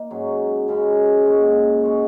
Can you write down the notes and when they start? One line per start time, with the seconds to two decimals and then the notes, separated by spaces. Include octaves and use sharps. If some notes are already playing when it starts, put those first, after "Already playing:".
Already playing: A#3 D#4
0.10 G#2 F#3 C#4
0.68 F#2 C#3 G#3
1.25 A#2 G#3 F#4
1.83 G#3 F#4